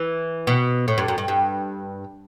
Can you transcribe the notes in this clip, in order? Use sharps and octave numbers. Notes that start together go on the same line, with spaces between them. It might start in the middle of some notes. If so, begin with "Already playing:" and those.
Already playing: E3
B2
A2
G2
F#2
G2
G2